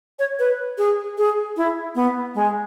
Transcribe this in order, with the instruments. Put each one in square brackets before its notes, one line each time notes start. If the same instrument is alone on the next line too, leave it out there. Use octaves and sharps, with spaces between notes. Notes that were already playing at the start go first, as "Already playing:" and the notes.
[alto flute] C#5
B4
G#4
G#4
E4
B3
G#3